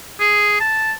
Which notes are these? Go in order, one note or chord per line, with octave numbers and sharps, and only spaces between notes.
G#4
A5